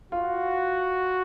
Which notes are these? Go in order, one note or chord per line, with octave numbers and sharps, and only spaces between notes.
F4 F#4